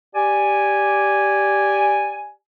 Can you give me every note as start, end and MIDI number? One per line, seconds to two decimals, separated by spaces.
0.15 2.33 67
0.15 2.33 74
0.15 2.33 80